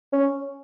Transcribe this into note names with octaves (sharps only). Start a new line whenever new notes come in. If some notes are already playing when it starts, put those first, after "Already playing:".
C#4